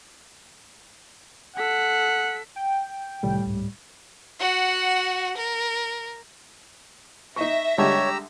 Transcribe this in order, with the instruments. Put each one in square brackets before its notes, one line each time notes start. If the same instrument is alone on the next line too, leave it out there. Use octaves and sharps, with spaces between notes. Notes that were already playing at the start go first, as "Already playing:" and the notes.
[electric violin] A4 B6 [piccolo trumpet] F#5
[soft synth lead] G5
[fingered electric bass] C2 C3 D#3 [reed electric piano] A2 G3
[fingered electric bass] C#2 G#2
[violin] F#4 F#5
A#4
[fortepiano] D#4 C#6 [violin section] E5 A#6
[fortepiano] D3 G3 G#3 [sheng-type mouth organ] G4 A#5 E6 [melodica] C#5